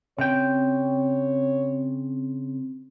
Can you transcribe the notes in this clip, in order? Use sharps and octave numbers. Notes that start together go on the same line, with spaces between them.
C#3 C4 C#5 G5